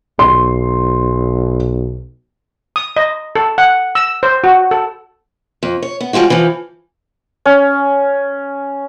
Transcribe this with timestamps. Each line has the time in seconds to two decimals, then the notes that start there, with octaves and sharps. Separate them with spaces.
0.19 B1 C6
2.76 D#6
2.96 D#5
3.36 A4
3.58 F#5
3.95 E6
4.23 C5
4.44 F#4
4.71 A4
5.63 F2
5.83 C#5
6.01 B3
6.13 F3 G3 G#3 F4 F#4
6.30 E3 F3
7.46 C#4